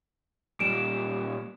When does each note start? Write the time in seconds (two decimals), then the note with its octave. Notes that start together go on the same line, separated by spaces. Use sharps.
0.60 A#2 G3 D7 E7